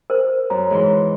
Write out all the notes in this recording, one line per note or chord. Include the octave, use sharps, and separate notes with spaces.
A#4 C5
F#2 A#5
G#2 E3 C6